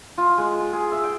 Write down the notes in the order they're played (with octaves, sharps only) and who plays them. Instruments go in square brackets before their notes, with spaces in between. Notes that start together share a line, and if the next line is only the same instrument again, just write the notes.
[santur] F4
G#3
G5
G#4
E5
G5